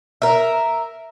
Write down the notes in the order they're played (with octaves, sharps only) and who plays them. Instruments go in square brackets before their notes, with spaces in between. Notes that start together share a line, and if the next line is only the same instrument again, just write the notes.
[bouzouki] A#4 E5